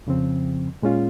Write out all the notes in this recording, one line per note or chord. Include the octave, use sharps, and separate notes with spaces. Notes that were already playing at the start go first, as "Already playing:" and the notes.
F2 C#3 F3 C4
A#2 G#3 C#4 F4